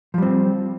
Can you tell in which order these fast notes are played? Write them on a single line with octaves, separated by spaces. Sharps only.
F3 G3 C4